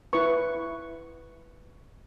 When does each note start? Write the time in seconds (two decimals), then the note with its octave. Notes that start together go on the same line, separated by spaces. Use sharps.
0.13 E4 B4 C#6